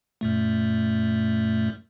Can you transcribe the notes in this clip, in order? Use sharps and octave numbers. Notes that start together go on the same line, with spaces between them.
F#2 A#2 A3